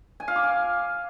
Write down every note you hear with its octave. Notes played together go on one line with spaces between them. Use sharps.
G#5
F5
D6
G#5